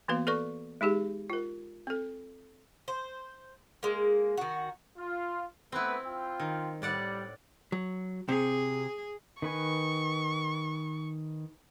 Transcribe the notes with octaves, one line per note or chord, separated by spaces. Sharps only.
E3 A#3 B3 F#4 B4 F5
A4 B4 D5 C#6
G#3 D#4 G4 G#4
F4 A#4
C4 A4
C5
G#3 A#3
D#3 F#4
F4
A3 B3 C4 E4 B4
F4 G5
D#3
A2 G3 D5 F#5
F#3
C3 G#4
D#3 B4 G#5 C#6